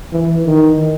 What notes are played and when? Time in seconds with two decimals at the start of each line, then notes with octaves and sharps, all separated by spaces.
0.12 E3
0.46 D#3